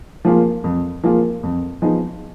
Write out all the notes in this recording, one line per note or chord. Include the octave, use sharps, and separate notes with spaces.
F3 A#3 F4 G#4
F2
F3 A#3 F4 G#4
F2
F3 B3 D#4 G#4